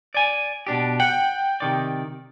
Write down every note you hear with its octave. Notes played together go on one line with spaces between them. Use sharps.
D5 G#5
B2 D4 G4
F#5 G5
C3 D#3 D5